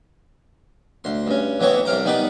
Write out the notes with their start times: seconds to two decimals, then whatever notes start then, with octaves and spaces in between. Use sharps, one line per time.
1.04 D2 C6
1.27 G2 C#4
1.60 A1 E3 B3 C4 C#5 C#6
1.85 C2 C3 F5 G5 A#5
2.05 D#3 G3 B3 D#4 B4 D5